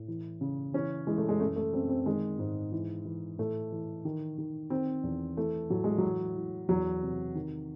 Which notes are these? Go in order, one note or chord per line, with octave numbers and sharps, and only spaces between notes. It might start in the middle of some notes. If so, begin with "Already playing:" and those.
Already playing: A2
E3
C#3
E3 C#4
E3 G#3
A3
G#3
F#2 A3
A3
F#2 C4
C4
D#3 G#3
G#2
E3
E3
A2 A3
E3
D#3
D#3
D#3 C4
E2
E3 A3
A2 F#3
G#3
F#3
E3
E3
E2 F#3
C3
D#3